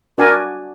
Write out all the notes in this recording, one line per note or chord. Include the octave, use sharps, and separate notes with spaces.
D4 F#4 A#4 D5 G#5